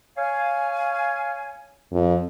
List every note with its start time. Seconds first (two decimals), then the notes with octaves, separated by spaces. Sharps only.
0.18 C#5 F5 G#5
1.93 F2